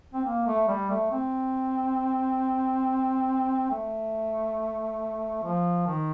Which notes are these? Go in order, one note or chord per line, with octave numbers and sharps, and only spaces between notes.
C4
A#3
A3
G3
A3
C4
A3
F3
D#3